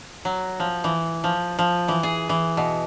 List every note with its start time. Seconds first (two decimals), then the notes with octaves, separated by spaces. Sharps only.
0.25 F#3
0.60 F3
0.84 E3
1.24 F3
1.59 F3
1.88 E3
2.03 G#4
2.29 E3
2.57 B2